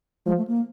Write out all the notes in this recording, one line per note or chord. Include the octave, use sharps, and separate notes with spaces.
F3 G#3
A3
A#3